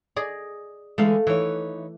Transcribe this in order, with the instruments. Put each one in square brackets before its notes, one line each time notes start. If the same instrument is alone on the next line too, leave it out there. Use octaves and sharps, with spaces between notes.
[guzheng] G#4 D5 D#5
[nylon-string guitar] D3 E3 G#3 [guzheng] A3 F5
[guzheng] E3 [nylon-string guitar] D#4 B4 C#5